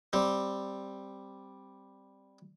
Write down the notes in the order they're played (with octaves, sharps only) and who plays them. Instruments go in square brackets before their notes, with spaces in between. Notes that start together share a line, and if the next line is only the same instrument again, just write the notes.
[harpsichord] G3 C4